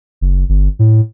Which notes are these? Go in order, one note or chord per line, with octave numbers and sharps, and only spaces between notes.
F#1
G1
A2